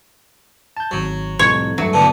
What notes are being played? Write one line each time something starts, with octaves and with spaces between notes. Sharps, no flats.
A5 G6
G#1 F#3 C#5
C2 F2 A2 C#5
G2 F#3 A3 C#7
B2 D3 E3 A5